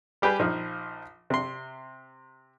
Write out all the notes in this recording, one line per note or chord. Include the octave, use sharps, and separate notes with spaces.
G3 G4 G#4 B4
A#1 F3 D#4
C3 C6